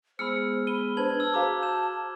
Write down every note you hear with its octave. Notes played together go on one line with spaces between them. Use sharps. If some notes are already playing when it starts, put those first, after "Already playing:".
G#3 B3 G#4 C5 B5 E6 F6 C#7
B5 D#7 G7
D4 B4 C5 A5 G#6 F#7
A5 E6
F#4 G#4 C5 F5 A#5 D6
E6 G6 E7